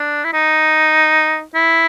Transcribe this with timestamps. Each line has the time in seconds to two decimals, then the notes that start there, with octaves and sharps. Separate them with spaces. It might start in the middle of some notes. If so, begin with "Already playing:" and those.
Already playing: D4
0.24 E4
0.33 D#4
1.55 E4